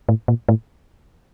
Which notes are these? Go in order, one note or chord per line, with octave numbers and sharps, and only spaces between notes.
A2
A#2
A2